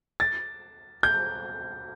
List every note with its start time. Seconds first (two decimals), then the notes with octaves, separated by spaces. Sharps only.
0.20 A6
1.03 G6